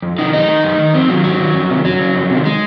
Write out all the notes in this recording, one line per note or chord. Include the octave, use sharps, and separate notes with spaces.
F2
C3 D#3 D#4
F#2 D#4
D#3
F#2
D#3
F2 C4
C3 D#3 F#3
G#2 F#3
D#3
F2
C3 D#3
F#2 F#3
C#3
F2
C3 D#3
G#3